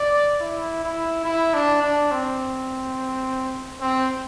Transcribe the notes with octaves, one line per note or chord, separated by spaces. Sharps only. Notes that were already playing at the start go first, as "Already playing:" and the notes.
Already playing: D5
E4
E4
E4
D4
D4
C4
C4